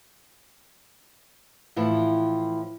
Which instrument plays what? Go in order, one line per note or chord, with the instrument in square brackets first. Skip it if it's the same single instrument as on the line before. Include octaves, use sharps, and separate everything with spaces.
[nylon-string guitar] A2 E3 F3 E4 F4